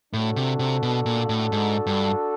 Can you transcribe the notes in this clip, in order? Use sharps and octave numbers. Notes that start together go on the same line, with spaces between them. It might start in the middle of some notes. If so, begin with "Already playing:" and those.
A2 D4 F#4 A4
C3
C3
B2
A#2
A2
G#2
G2